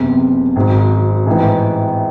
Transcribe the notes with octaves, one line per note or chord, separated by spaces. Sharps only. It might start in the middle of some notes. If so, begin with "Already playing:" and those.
Already playing: F#1 E2 C3
G#1 G#2 F#3
A1 G#2 E3